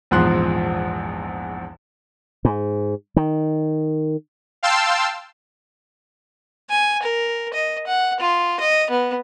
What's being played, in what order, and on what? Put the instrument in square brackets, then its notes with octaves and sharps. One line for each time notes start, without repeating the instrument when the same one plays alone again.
[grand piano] A#1 E2 G#2 F3 C6 F#6
[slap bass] G#2
D#3
[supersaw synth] F5 G5 A5 C6 E6
[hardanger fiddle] G#5
A#4
D#5
F#5
F4
D#5
B3